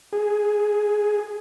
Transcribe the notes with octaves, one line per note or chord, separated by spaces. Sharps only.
G#4